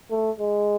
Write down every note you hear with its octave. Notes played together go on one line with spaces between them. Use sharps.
A3
G#3